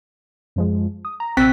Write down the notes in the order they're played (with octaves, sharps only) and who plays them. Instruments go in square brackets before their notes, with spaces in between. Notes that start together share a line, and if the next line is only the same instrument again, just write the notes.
[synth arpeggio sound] F#2 F3 G#3
D#6
A#5
[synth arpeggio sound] A#1 C3 E6 [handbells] C4 B6